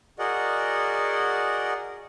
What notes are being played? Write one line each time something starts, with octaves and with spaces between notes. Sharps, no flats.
F#4 G#4 A#4 D5 D#5 F#5